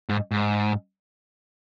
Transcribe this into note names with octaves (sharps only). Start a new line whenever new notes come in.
G#2
G#2